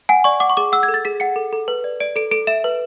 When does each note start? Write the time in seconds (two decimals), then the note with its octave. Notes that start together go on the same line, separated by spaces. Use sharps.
0.09 F#5 G#5
0.24 D5 C#6
0.40 F#5 D6
0.50 C#6
0.57 G#4 D6
0.72 F#5 E6
0.83 G#6
0.88 A4
0.94 A6
1.05 G#4 B6
1.20 F#5 C#7
1.36 A4
1.53 A4
1.68 B4
1.84 D5
2.00 D5 D7
2.16 A4 D7
2.31 A4 D7
2.47 E5 E7
2.64 B4